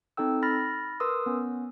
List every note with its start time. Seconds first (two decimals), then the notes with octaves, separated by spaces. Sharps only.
0.17 C4 D#4 A4 G5 E6
0.43 B5 F6 A6 A#6
1.00 A#4 B4 C6 D#6 E6
1.26 B3 C#4